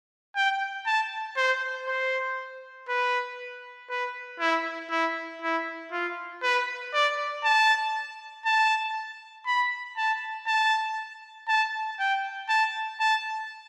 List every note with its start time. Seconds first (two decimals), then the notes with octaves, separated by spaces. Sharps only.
0.36 G5
0.86 A5
1.37 C5
1.88 C5
2.89 B4
3.90 B4
4.40 E4
4.91 E4
5.42 E4
5.92 F4
6.43 B4
6.93 D5
7.44 A5
8.45 A5
9.46 B5
9.97 A5
10.47 A5
11.48 A5
11.99 G5
12.49 A5
13.00 A5